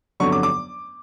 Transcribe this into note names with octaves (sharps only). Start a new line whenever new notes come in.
G1 F2 D3 F#3 C#6
D6
D6